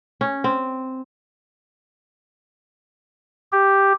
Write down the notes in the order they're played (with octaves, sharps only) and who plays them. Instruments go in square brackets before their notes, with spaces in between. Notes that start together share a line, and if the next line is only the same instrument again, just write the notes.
[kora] C#4
C4
[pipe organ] G4